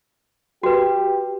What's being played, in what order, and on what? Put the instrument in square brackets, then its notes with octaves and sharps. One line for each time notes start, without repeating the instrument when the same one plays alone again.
[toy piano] F#4 B4 [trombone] G4